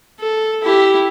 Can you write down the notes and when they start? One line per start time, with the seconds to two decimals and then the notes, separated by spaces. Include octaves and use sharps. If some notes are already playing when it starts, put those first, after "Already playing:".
0.20 A4
0.63 E4 G4